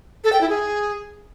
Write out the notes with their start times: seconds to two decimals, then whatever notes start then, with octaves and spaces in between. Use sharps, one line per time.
0.24 A4
0.33 G5
0.41 E4
0.49 G#4